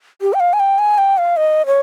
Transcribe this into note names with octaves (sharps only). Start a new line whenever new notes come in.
G4
G5
F5
G#5
G5
G#5
G5
F5
D#5
C#5